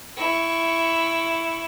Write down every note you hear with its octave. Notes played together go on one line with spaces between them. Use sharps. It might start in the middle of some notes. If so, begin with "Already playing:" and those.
E4 C#6